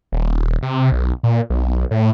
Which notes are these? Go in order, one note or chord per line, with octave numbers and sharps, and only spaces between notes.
D#1
C3
B1
A#2
B1
A2